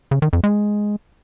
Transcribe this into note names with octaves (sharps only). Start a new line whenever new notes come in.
C#3
D#3
F2
G#3